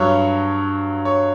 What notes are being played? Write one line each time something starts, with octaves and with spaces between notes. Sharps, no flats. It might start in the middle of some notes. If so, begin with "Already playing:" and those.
Already playing: G2 F#3 C#5
C#5